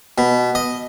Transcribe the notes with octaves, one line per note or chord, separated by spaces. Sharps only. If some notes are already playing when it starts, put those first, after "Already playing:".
B2
D#5